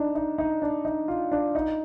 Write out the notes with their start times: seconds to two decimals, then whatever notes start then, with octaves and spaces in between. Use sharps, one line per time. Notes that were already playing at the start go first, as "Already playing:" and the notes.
Already playing: D4 D#4
0.15 D#4
0.38 D#4
0.62 D4
0.85 D#4
1.08 F4
1.32 D4
1.55 D#4